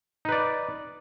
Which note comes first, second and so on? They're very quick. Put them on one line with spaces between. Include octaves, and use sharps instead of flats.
D#4 B4 D5